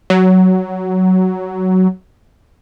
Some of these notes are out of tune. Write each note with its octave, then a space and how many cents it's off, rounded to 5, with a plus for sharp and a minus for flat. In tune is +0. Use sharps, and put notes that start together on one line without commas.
F#3 +10